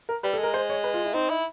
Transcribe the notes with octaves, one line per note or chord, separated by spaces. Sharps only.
A#4
G3 B4
A4
G#3 A#4
C5
C#5
B4
F4
E4
C4 D#4
E4